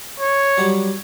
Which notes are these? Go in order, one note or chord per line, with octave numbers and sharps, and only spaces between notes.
C#5
F#3 G3